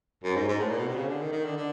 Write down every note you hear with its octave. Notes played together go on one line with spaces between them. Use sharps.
F#2
G#2
G#2
A2
A#2
B2
C3
C#3
D3
D#3
D#3
D3
D3